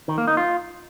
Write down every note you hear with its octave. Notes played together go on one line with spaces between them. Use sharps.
D#3
A#3
D#4
F4